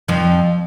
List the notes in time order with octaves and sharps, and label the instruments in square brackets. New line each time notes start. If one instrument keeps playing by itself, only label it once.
[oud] F2 F3